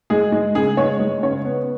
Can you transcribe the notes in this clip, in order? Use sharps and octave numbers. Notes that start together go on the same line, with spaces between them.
G#3 G#4
G#3
C#3 G#4
G#3 C#5
G#3
C#3 C#5
B3